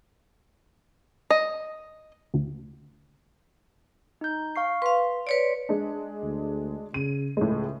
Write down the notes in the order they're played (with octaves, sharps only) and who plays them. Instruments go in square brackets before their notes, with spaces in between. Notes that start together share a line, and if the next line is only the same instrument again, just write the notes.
[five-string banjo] D#5
[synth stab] D2
[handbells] D#4 G6
F5 C#6 C7
[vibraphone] B4 F5 [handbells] C6
[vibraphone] B4 C#5 D5
[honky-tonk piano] G#3 D4
[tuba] D2
[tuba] C#3 [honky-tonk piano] D#7
[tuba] C#2 [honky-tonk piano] A2 G#3